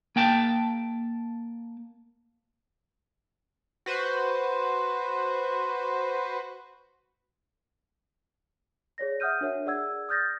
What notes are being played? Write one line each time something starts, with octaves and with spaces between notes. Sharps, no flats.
A#3 G5 A5
F#4 B4 C5
G#4 C#5 D5 A#6
E5 F#5 D#6 F6 G6 D#7
D4 F#4 A#4 C#5 E5 F#5
G#4 D5 F#5 E6 G#6
D#6 F6 G6 A6 A#6